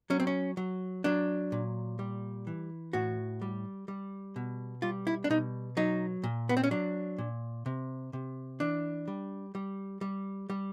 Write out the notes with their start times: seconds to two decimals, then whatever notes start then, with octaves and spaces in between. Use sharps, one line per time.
0.10 F#3 C#4
0.20 C4
0.27 C#4
0.57 F#3
1.04 F#3 D4
1.52 A#2
1.99 G3
2.47 E3
2.93 A2 F#4
3.42 G3
3.88 G3
4.36 B2
4.82 G3 F4
5.07 E4
5.24 D4
5.30 B2 D#4
5.77 F#3 D#4
6.24 A#2
6.49 B3
6.57 C4
6.64 C#4
6.71 F#3 D4
7.18 A#2
7.66 C3
8.13 C3
8.60 E3 D4
9.08 G3
9.55 G3
10.01 G3
10.50 G3